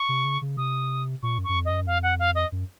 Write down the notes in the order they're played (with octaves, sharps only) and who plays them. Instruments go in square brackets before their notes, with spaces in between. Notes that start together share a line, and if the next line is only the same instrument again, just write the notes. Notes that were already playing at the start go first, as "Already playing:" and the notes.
Already playing: [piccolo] C#6
[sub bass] C3
C#3
C#3
[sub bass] C3 [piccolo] D#6
[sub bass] A#2 [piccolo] C#6
[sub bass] F#2
[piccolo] C#6
[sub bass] F#2
F2
[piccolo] D#5
[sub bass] F#2
[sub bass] F2 [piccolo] F5
[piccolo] F#5
F5
D#5
[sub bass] F#2